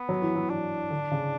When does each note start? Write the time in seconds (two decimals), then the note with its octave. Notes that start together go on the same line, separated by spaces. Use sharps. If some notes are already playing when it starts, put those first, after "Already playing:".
Already playing: B3
0.09 F#3
0.22 E3
0.35 F#3
0.50 E3 D4
0.90 D3
1.11 C#3